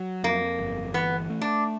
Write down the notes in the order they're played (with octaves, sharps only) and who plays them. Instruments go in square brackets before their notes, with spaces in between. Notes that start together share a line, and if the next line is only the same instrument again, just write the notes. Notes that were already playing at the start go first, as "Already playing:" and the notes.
Already playing: [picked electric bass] F#3
[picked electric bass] F2 [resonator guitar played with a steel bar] A#3
[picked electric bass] G1
[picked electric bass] E3 [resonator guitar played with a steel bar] B3
[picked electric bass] A3
[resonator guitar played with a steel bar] D4